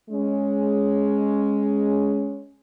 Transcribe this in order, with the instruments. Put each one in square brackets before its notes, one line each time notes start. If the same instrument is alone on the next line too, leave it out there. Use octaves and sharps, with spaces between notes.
[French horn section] G#3 C#4